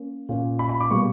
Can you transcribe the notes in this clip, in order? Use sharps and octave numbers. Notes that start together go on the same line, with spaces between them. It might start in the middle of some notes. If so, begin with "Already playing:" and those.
Already playing: A#3 C#4
A#2 A#3 C#4
B5
B5
D6
B2 G3 A#3 C#6